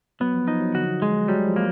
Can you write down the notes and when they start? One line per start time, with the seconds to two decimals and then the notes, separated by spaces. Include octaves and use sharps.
0.20 F#3 B3
0.34 F3
0.47 F3 D#4
0.61 F#3
0.74 D3 F#4
1.02 G#3
1.28 F#3 G3
1.47 F3
1.56 A#3